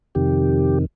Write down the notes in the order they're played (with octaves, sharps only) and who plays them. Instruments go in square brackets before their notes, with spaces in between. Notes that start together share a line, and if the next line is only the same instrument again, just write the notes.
[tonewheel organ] F2 C3 D#3 G4